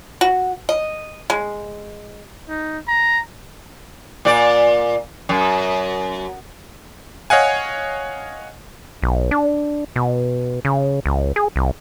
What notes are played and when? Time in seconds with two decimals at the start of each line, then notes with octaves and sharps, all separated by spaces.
0.21 F#4
0.69 D#5
1.30 G#3
2.49 D#4
2.88 A#5
4.25 A#2 D5
5.29 F#2
7.30 C#5 D#5 F5 F#5 G#5
9.02 B1
9.31 D4
9.96 B2
10.65 C#3
11.06 C#2
11.36 G#4
11.56 C2